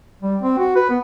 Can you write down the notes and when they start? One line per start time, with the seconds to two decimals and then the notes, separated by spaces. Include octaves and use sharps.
0.22 G3
0.42 C4
0.58 F#4
0.76 B4
0.89 B3